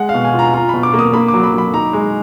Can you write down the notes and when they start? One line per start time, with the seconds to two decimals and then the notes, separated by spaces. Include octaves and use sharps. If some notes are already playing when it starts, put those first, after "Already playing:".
Already playing: G#3 F#5
0.09 F5
0.14 B2
0.24 G#5
0.34 F4 A#5
0.54 F4 A#5
0.69 B2 B5
0.83 D6
0.94 A#3
0.99 D#6
1.13 A#3 B5
1.28 D6
1.34 F#3
1.43 B5
1.54 F#3 B5
1.73 D#4 A#5
1.93 G#3